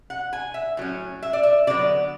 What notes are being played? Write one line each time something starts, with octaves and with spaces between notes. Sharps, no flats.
F#5
G#5
E5
A2 F#3 C#4
E5
D5
E5
D3 F#3 B3 D5